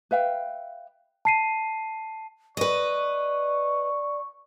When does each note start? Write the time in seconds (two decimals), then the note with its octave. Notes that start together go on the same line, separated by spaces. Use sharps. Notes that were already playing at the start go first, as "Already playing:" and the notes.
0.11 B4 E5 F5 G5
1.25 A5 C7 D#7
2.57 B4 D5 D#5 C#6